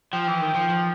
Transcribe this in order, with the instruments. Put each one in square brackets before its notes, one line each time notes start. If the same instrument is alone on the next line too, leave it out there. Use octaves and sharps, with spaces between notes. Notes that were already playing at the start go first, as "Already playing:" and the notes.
[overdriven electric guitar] F3 [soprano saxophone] G5
[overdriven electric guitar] E3
D#3
F3
F3